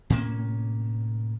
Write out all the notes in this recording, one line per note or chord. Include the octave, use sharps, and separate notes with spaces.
A2 C3 A#3 C#4